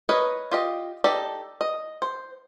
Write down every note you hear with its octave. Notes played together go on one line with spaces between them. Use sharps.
A#4 B4 C#5 D#5
F4 G4 D#5
D#4 G4 A4 D5
D#5
C5